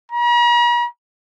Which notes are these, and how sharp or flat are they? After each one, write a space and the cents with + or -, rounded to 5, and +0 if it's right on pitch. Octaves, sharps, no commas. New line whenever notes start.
A#5 +45